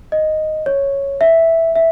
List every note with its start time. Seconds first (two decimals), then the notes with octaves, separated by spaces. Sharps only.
0.12 D#5
0.66 C#5
1.21 E5
1.76 E5